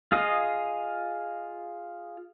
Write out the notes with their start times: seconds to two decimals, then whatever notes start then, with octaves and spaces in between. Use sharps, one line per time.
0.12 F4 G#4 D#5 F5